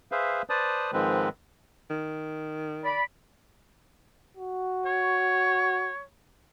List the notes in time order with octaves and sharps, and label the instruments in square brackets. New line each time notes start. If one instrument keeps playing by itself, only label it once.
[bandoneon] G#4 B4 C5 E5 F5
B4 C5 D5 A5 D#6
G#2 D#3 F3 G#3 C4 B4
[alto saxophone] D#3
[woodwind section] D5 B5
[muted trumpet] F#4
[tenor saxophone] C#5